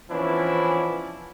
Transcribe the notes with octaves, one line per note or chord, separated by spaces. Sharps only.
E3 F3 B3 C#4 D4 E4